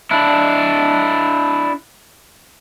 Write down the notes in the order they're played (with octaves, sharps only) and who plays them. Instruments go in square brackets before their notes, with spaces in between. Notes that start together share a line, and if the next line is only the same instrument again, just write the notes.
[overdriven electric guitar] D4 E4